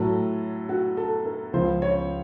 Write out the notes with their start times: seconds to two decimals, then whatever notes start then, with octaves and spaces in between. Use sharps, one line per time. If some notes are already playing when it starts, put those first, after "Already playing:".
Already playing: A2 F#3 A4
0.69 F#4
0.97 A4
1.25 A#4
1.53 C#2 C#3 F3 C5
1.82 C#5